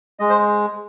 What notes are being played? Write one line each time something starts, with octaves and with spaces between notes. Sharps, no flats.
G#3 D#5
C5